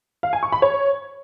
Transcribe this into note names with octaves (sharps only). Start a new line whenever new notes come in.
F5
G#5
C#6
B5
C#5